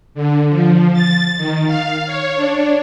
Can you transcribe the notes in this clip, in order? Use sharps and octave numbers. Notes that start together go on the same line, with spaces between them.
D3
F3
A6
D#3
F5
C#5
D4